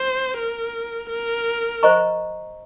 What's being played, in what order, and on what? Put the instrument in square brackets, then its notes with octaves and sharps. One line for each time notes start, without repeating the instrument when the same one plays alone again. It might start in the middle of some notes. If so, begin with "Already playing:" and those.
Already playing: [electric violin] C5
A#4
A#4
[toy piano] C5 D#5 A#5 C#6